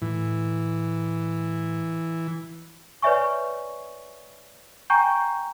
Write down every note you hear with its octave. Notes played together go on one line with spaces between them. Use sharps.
A2 E3
B4 C#5 D5 E5 G#5 C#6
G5 G#5 A#5 C#6 G6